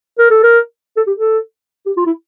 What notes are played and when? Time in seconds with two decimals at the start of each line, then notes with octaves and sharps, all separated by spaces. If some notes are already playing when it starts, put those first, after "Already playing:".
0.19 A#4
0.31 A4
0.43 A#4
0.97 A4
1.07 G4
1.17 A4
1.86 G4
1.97 F4
2.06 E4